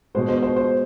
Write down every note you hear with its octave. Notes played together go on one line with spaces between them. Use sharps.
B2 G#3 C5
C5
C5
C5